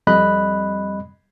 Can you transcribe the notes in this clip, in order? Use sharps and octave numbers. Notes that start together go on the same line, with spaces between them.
F2 G3 D#5 B5 F#6